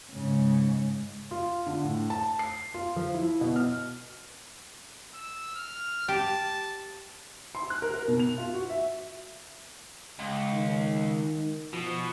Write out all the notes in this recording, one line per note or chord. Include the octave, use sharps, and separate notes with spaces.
G#2 C#3
F4
D3
A2
A5
C7
F4
F3
E4
B2
F6
E6
F6
G4 A5
C6
F#6
A#4
A#4
B2
F7
F4
F#4
E5
C#2
D#3
B2 F3